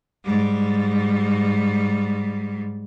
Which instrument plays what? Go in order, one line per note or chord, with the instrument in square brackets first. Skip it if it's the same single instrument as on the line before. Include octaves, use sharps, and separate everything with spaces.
[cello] G#2 G3